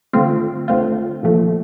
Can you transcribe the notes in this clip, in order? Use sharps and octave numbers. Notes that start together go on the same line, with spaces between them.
D3 A3 C4 F4
D3 A3 C4 F4
A#2 F3 A3